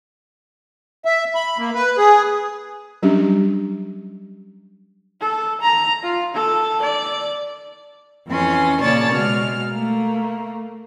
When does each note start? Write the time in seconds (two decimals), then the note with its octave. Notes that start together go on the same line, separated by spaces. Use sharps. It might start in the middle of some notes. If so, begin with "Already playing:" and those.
1.05 E5
1.35 B5
1.58 A#3
1.75 B4
1.98 G#4
3.03 F#3 G3 C#4 D4 G4
5.21 A4
5.62 A#5
6.03 F4
6.34 A4
6.83 D5
8.27 F2 E3 C#4 C6
8.82 A#2 C#3 C#5 D5 A5 A6
9.13 B2 G#3 F6
9.70 A3 A#3